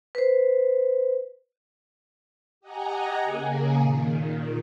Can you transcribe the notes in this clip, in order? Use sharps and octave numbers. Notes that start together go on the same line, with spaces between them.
B4 C5
G4 D#5 F#5 G#5 A#5
C#3 A#3 G#4
A#2 D#3